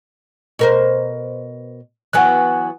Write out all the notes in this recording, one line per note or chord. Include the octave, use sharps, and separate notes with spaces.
B2 A#4 C5
E3 F#3 B3 F#5 G#5 F#6